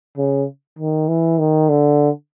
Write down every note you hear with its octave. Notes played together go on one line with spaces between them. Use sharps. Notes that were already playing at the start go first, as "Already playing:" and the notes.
C#3
D#3
E3
D#3
D3